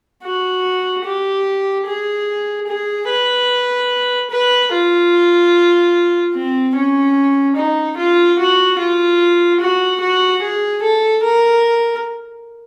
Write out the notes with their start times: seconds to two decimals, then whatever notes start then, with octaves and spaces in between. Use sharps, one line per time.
0.24 F#4
1.05 G4
1.86 G#4
2.67 G#4
3.09 B4
4.30 B4
4.72 F4
6.34 C4
6.75 C#4
7.56 D#4
7.97 F4
8.39 F#4
8.79 F4
9.61 F#4
10.01 F#4
10.42 G#4
10.82 A4
11.23 A#4